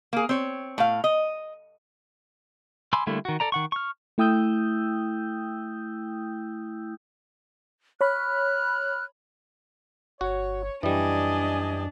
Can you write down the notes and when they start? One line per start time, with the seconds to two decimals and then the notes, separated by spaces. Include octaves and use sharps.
0.13 A#3 G#4
0.29 C4 C#5
0.78 A2 F5
1.04 D#5
2.93 G#5 B5 C6 D6 E6
3.07 D3 G3 A3 A#3 E4
3.25 D#3 F#4
3.40 A4 D5 A#5
3.52 D#3 F#5 C#6
3.72 C#6 F6
4.18 A3 E4 G5 D#6 E6 G6
8.01 C#5 B5 F6 F#6
10.21 G1 F#4 C#5
10.83 F#2 E3 G3 D4 D#5 G#5